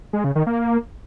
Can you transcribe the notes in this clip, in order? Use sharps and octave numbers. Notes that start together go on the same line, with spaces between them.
G#3
C#3
D#3
A#3